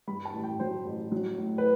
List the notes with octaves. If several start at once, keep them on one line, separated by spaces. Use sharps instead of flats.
G2 B5
A5
A1
G5
F#3 C5
A1
F#3
A2
B4